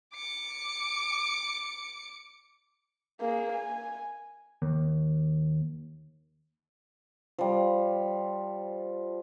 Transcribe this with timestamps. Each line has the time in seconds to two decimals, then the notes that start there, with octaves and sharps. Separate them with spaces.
0.14 D6 C#7
3.21 A#3 G#4
3.52 G#5
4.62 D#2
7.38 F3 G3